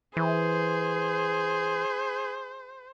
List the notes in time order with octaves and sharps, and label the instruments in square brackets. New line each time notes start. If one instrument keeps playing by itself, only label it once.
[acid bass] E3 [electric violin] G#4 [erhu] C5